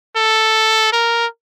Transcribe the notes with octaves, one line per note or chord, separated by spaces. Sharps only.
A4
A#4